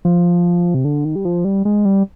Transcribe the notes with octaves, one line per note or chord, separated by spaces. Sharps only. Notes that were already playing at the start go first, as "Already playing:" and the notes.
F3
C3
D3
D#3
G3
F3
G3
G#3
G3